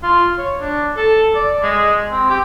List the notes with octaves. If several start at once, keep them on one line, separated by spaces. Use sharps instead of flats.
F4
C#5
D4
A4
D5
G#3
C4
G4